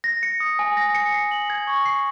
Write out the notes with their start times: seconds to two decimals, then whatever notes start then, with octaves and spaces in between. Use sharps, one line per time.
0.04 A#6
0.23 C#7
0.40 D#6
0.59 G#5
0.77 A#6
0.95 C#7
1.14 C7
1.31 F#7
1.50 G#6
1.67 C#6
1.86 C7